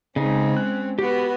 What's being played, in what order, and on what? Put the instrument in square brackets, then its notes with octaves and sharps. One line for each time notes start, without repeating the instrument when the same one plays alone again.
[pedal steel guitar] C#3 D#4 [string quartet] G#3 C4 C#4
[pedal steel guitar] F#6
[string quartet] B3 F#4 [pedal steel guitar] G4